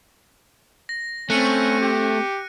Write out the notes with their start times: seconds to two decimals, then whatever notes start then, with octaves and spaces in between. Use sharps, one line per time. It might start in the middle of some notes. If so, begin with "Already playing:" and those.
0.89 A#6
1.30 A3 C4 C#4 F#6 C#7 D#7
1.80 G4